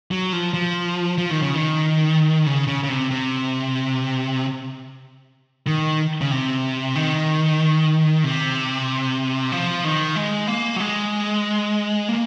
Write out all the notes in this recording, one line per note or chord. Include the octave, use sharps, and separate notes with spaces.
F#3
F3
F3
F3
D#3
C#3
D#3
C#3
C#3
C#3
C3
C3
D#3
C#3
C3
D#3
C3
F3
D#3
G#3
A#3
F#3
G#3
A#3